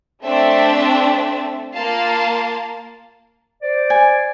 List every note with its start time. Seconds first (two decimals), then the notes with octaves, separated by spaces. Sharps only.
0.25 A3 C4 D4 E5 A5
1.74 A#3 F4 F5 A5
3.62 C5 D5
3.90 G#5